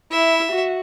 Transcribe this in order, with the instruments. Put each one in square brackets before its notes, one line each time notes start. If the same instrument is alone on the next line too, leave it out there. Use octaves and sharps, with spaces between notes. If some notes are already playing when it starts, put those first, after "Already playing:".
[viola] E4 [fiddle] E5
[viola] F#4